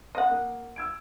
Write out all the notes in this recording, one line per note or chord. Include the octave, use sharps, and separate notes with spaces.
D#5 F#5
A#3
E6 G#6 D7